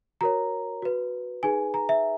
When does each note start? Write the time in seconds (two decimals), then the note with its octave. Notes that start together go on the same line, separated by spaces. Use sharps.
0.21 F#4 A#4 C#5 A#5
0.82 F#4 B4
1.43 D#4 G#4 B4 G#5
1.74 A#5
1.89 E5